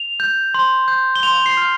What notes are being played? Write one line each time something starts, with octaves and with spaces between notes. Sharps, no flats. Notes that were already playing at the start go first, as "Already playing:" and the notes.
Already playing: F7
G6
C6
G6
G7
C6 F7
C7
F6